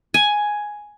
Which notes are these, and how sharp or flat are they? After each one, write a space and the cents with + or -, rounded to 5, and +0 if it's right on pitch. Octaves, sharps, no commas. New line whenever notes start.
G#5 +5